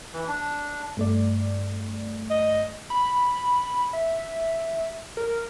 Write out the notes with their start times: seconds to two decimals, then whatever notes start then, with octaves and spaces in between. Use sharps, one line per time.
0.14 E3
0.28 D4
0.97 G2 A3 D5
2.30 D#5
2.90 B5
3.93 E5
5.17 A#4